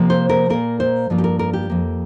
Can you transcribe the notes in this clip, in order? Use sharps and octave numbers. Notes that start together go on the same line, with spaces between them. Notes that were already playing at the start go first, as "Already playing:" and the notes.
Already playing: C3 F3 A#3
C5
A#4
A#2 A#3 A#4
C5
G2 F3 A#3
G4
A#4
A#4
G4
F2 F3 A#3